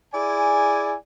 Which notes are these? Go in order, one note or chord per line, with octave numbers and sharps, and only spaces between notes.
E4 G#4 D5 G#5